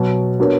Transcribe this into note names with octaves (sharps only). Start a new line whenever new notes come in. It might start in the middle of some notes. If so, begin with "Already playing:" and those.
Already playing: B2 F#3 B3
B3 D4 F#4 A#4 C#5